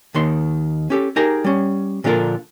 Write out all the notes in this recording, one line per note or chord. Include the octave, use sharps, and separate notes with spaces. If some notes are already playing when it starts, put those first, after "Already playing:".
D#2 D#3 C6
C#4 G4 A4
D#4 G4 G#4 A#4 A#5
G3 C#4
A#2 D3 F3 F4 A4 A#4